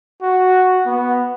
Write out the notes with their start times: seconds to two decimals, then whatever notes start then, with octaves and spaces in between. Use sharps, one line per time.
0.22 F#4
0.86 B3